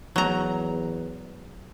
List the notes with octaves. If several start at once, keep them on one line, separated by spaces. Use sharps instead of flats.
E2 F#3 A#5